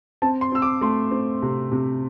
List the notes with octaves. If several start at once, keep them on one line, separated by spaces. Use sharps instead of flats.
C4 A5
C6
C4 E6
D6
A3 C6
C4
C3
C3